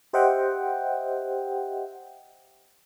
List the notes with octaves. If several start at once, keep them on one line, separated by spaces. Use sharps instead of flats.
G4 C5 D#5 E5 F#5 G5